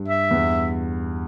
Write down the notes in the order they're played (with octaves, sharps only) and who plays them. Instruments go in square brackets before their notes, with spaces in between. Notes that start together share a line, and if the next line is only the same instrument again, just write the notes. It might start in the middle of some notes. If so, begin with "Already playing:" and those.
Already playing: [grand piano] G2
[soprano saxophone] E5
[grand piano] E2